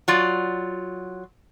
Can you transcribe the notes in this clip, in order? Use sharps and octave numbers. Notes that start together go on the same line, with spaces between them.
F#3 F4 D5